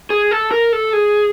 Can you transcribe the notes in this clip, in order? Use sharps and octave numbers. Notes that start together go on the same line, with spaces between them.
G#4
A4
A#4
A4
G#4